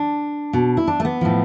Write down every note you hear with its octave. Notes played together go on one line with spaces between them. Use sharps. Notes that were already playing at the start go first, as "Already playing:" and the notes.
Already playing: D4
B2
E4
D4
A3
B3
A2 F3